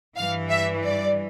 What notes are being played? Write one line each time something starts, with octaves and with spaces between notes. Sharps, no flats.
G2 E3 F5
E5
D5